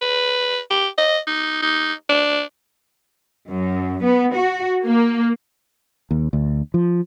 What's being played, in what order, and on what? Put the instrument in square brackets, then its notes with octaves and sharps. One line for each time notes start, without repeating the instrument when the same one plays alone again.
[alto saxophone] B4
G4
D#5
D#4
D#4
D4
[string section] F#2
B3
F#4
A#3
[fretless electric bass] D#2
D2
F3